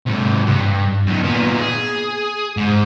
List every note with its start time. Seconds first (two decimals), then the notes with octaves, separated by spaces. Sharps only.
0.06 G#2 C3
0.47 G2
1.07 F#2 D#3
1.23 A#2 B3
1.60 G#4
2.57 G#2